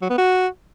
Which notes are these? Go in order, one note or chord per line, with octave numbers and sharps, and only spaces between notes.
F#3
B3
F#4